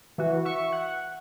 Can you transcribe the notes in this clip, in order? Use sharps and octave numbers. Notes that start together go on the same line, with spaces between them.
E3 F#4
E5 C#6
F#5